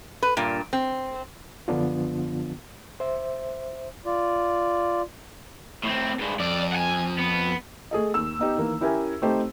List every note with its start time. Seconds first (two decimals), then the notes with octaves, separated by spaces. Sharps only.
0.23 B4
0.37 G2 A#2
0.73 C4
1.68 F#2 D3 F3 B3 D4 F4
3.00 C5 E5
4.05 F4 D5
5.84 A2 C4
6.19 G2 G#3
6.40 F2 D5
6.72 F#5 G#5
7.19 B3
7.91 A3 G#4 A4 D#5
8.14 D#2 E6
8.39 B3 D#4 G4
8.57 D#3 E3 A#3
8.81 C#4 E4 G4 A#4 E5 G#5
9.22 A3 C4 D#4 G4 C5